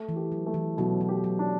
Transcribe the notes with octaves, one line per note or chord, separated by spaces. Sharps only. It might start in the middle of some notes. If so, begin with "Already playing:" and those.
Already playing: A3
E3
G4
F#3
A3
E3
B2 F#3
F#3
G4
F#3
D4